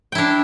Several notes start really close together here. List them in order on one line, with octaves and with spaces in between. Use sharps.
G5 E4 D4